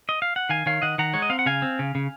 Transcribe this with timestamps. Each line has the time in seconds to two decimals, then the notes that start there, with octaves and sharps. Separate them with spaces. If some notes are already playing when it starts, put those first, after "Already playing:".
0.09 D#5
0.22 F5
0.36 F#5
0.49 D#3 F5 G#5
0.66 D#3 C#5 F5
0.82 D#3 D#5 F#5
0.98 D#3 F#5 A#5
1.14 G#3 C#5
1.22 D#5
1.30 C4 F5
1.39 F#5
1.46 C#3 F5 G#5
1.62 C4
1.79 C#3
1.95 C#3